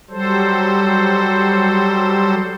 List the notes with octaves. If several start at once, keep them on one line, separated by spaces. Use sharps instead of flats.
F#3 G3 A4 C5